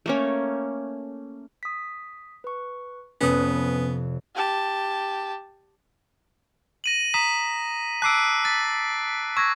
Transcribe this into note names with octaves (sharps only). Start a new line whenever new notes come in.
A3 A#3 C#4
D#6 B6
B4 C#6
F1 F2 C3 B3 C#4 B4 D#6
G4 A5
A#6 D#7 F#7
A#5 D#6 B6 E7
A5 D6 E6 F#6 C7 D7
A6 B6
C#6 E6 G#6 A#6